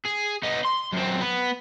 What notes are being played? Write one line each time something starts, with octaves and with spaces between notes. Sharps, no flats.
G#4
B3 D#4
C6
F#2 C4
B3